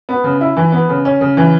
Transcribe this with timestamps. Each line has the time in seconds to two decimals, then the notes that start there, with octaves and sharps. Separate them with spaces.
0.09 B3
0.24 C#3
0.41 E4
0.57 E3
0.72 B3
0.89 C#3
1.05 C#4
1.21 C#3
1.37 E3